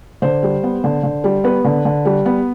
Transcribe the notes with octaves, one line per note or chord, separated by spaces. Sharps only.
D3 C5
G3
B3
D3
D3
G3
B3 B4
D3
D3
G3
B3